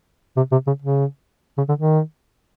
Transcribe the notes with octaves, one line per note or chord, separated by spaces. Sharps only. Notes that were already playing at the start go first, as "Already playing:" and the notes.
C3
C3
C#3
C#3
C#3
D3
D#3